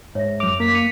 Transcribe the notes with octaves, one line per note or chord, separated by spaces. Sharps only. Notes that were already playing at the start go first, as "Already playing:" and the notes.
G#2 C#5 E5 A#6
F#2 D6 F7
A#3 B6
C#7 D#7 F7